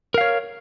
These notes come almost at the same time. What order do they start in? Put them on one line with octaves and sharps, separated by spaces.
A#4 F5 C#5